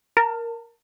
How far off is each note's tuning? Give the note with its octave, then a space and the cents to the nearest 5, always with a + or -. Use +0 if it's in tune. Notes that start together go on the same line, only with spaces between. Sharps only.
A#4 +0 A5 +30